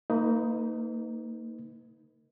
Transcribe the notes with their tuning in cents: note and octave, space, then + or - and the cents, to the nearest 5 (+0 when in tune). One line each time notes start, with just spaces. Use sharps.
A#3 -25 D#4 +10 B4 +30